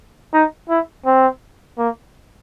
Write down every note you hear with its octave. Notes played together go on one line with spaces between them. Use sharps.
D#4
E4
C4
A#3